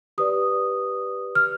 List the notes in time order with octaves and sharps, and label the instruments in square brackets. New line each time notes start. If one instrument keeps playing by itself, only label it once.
[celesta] G4 B4 D5 D#6
F6